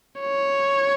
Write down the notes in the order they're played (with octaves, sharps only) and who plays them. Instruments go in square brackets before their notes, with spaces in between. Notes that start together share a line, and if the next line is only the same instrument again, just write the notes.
[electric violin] C#5